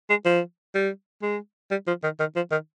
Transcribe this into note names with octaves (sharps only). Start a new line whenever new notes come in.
G#3
F3
G3
G#3
G3
F3
D#3
D#3
F3
D#3